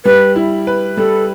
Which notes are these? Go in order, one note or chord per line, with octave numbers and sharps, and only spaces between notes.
G3 B4
E4
B4
G3 A4